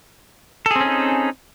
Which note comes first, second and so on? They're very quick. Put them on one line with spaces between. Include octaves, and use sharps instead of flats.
A4 G#4 C4 C#4 D#4